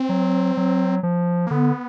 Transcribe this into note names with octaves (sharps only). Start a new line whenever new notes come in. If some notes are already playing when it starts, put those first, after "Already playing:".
Already playing: C4
F#3
F#3
F3
A#3
D3 B3